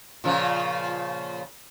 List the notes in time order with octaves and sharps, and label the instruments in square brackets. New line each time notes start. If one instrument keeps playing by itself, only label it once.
[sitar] A#2 C#3 F3